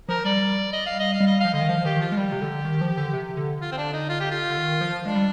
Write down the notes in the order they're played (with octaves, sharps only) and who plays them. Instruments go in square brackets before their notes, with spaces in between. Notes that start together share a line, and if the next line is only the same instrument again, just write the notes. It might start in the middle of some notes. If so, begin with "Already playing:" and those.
[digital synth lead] F3 [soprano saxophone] A#4
[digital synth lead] G3 [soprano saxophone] D5
[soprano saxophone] D#5
F5
D#5
F5
[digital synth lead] G3
[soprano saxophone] D#5
[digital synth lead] F3 [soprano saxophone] F5
[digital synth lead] D3 [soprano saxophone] D#5
[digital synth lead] D#3
[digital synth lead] F3 [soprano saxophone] F5
[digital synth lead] D#3 [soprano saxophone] G4
[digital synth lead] F3 [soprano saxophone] F4
[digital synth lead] G#3
[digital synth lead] G3 [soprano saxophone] G4
[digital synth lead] C3
D3
D#3
F3
D3
C3
D3
[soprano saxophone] F4
C4
D4
D#4
F4
G4
F4
[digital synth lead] D3
D#3
F3
[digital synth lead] G#3 [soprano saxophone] D4
[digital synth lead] G3